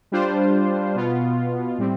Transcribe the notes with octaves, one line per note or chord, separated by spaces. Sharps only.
G3 D4 F4 C5
B2 B3 F4
A2 G3 C4